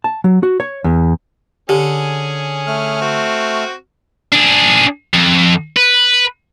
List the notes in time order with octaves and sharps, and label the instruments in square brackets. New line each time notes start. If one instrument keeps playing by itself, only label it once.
[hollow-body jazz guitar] A5
F#3
F#4
C#5
E2
[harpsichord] D3 [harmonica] C#4 G#4 [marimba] G4
[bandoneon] A3 F6
[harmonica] C4 F#4
[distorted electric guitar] D4 G#4
F2
B4